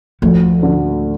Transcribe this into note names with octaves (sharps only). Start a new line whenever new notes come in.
D2 F3
D3